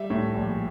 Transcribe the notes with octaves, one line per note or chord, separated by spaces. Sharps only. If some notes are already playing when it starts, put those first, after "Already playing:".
Already playing: G3 E5
A2
A#1